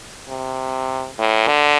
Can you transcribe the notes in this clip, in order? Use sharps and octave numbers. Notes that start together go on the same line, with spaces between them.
C3
A2
D3